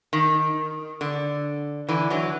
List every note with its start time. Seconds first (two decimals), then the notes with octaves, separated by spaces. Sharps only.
0.13 D#3
1.01 D3
1.89 D3 E3
2.10 E3 F#3